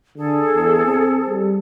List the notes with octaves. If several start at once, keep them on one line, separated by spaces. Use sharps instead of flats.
D3 G#4 A4
E2
C4
G3